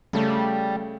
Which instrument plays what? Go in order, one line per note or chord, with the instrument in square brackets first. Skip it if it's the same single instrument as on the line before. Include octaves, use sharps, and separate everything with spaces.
[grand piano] C#3 A3 [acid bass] G3